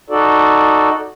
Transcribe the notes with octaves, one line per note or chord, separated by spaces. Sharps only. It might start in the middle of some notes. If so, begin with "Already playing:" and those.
D#4 F#4 A4 D5